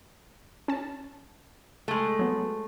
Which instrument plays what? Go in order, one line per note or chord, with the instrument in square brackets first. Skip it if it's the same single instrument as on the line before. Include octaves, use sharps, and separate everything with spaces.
[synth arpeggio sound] C#4 A5
[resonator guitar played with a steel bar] G#3 A3
[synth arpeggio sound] F#3 B3